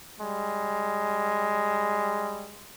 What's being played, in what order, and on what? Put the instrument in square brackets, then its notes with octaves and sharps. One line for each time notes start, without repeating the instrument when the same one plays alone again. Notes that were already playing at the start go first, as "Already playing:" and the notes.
[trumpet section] G3 G#3